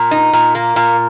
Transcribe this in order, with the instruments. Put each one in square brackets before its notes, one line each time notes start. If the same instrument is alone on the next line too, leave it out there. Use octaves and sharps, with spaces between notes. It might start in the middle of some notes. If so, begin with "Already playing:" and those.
Already playing: [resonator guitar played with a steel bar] A#2
D#4
A#2
A#3
A#2